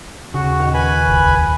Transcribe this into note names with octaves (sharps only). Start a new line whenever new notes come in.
D#2 C#3 F#4 F#5
D#2 A#2 D#3
B4 G#5 B5
F#1 C#2